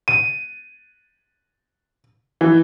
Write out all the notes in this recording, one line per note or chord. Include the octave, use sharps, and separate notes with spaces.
D#7
E3